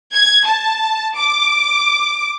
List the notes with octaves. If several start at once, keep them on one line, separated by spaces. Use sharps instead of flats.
G#6
A5
D6